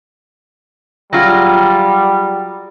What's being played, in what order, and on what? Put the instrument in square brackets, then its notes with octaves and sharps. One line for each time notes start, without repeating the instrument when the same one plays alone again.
[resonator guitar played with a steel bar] F#3 F4 G#4 [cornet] G3